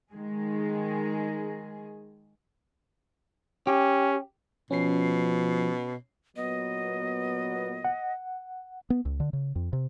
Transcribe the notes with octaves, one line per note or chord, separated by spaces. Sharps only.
D#3 G#3 G#4
C#4 G4
B2 F3 C#4 C7
A#2 F#3 B3 D#5
F#5
B3
C#2
D3
C#3
F2
C3